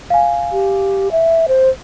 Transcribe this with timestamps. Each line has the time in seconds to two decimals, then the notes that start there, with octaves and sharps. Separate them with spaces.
0.10 F5 G#5
0.52 G4
1.12 E5
1.48 C5